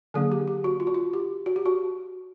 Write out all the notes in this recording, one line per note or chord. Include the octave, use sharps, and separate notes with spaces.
D3 F#3 A#3 D4 G#4
G4
G4
F#4
F4
F#4
F4
G4
F#4
G4
F#4